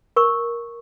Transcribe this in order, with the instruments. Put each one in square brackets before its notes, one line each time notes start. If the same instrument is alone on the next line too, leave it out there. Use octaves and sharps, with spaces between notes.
[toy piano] A#4 C#6